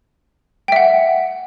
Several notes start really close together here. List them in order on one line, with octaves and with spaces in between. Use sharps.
G5 E5 F#5